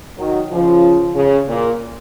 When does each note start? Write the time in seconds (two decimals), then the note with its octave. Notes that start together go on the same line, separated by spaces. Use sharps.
0.18 D#3 F#3
0.51 C#3 F3
1.15 C#3
1.48 A#2